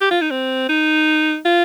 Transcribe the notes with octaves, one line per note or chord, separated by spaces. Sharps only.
G4
F4
D#4
C4
D#4
F4